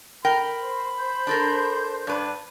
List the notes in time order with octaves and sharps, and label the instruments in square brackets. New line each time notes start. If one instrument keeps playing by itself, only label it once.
[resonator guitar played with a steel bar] A#4 G5 [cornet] B5
[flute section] C5
C5 G6
[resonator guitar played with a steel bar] D4 A4 A#4
[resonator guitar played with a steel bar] G2 B4 [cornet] D4